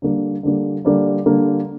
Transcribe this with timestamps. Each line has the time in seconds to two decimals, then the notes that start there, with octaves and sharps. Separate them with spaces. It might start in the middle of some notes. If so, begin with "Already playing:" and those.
0.02 D3 G3 A#3
0.43 D3 G3 A#3
0.85 D3 G3 A#3
1.26 D3 G3 A#3